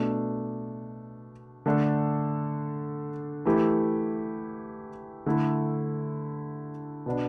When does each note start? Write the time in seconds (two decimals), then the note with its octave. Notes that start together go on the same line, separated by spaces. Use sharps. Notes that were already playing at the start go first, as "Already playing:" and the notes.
Already playing: B2 A3 D4
1.66 D3 A3 D4 A4
3.45 E3 A3 E4 G4
5.26 D3 A3 E4 A4
7.06 B2 B3 D4